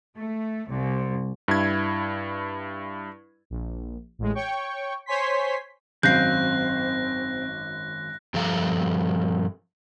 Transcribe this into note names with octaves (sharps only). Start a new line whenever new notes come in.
A3
C2
G2 E4 G#6
A#1
A1 G#3
C#5 G5 C#6
C5 C#5 G#5 C6 B6
G#1 F#2 C4 F5 F#6 G6 A#6 C7
G2 F3 A4 F5 A#5